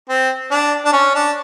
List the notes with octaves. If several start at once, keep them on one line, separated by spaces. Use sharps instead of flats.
C4
D4
D4
C#4
D4